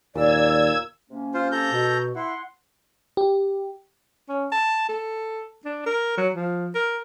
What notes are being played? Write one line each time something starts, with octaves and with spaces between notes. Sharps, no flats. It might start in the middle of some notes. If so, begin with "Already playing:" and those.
D#2 A#2 D5 E6 G#6
C3 A#3 C#4
F4 C5
A4 A#5 G6
B2
E4 F#5 C6
G4
C#4
A5
A4
D4
A#4
F#3
F3
A#4